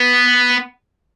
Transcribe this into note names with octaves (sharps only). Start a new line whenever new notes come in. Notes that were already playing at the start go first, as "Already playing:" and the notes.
Already playing: B3